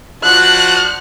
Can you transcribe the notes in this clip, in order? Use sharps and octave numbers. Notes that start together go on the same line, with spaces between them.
F3 D4 F#4 F#6